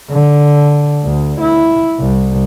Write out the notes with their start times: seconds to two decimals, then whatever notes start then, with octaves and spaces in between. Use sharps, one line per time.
0.11 D3
1.03 D2
1.41 E4
1.99 C2